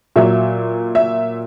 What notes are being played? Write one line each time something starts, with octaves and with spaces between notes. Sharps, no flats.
A#2 F#3 E5
E5